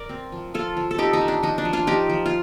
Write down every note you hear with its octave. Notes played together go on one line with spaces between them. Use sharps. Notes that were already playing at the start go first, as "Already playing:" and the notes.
Already playing: A#4 D5
C4
F3
F3 F4 A4
F3
A4
C4 D#4 G4
D#4
F3
D4
F3 D#4
D4
F3
D4 F4
F3 D#4 G4
F3
F4